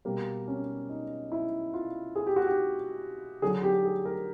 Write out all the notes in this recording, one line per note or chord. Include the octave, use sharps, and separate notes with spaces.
B2 G3 A#3
C#4
D#4
E4
F4
G#4
G4
F#4
G4
D3 F#3 G#4
G4
G#4
A#4